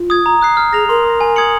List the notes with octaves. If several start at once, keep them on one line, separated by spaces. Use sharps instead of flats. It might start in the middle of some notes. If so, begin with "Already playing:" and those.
Already playing: F4
D#6 G#6
A#5
D#6 F#6 C7
F6
G#4 A#6 F7
A#4 C6
D#6
A#6
G#5
D#6 G#6 C#7 F#7